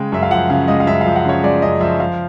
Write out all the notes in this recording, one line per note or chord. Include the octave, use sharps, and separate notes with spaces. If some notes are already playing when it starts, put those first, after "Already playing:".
Already playing: C#3 G#3 G5
F#2 E5
F5
F3 F#5
C#3 F5
G#3 D#5
F5
F#2 E5
F3 F5
F#5
C#3 C#5
G#3 D5
F#2 D#5
F3 E5
F3 F5